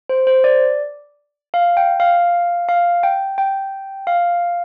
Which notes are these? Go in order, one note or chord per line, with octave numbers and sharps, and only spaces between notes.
C5
C5
D5
F5
G5
F5
F5
G5
G5
F5